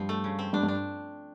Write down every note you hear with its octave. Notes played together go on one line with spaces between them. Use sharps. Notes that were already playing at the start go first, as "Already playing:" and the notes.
Already playing: G2 F3 C4
A3
C#3
C4
G2 D4
G2
D4